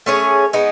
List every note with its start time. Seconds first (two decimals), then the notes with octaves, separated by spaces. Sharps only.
0.06 A3 C#4 G#4 C#5
0.53 G#3 B3 D#4